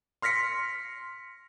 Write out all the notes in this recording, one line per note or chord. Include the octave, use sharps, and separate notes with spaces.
C6 F6 A#6 B6 C#7